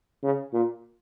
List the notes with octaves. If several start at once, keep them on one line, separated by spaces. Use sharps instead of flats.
C#3
A#2